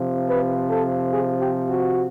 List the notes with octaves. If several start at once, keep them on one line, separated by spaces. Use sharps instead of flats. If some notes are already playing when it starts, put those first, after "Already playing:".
Already playing: C3 F3
B4
A4
G#4
G4
F#4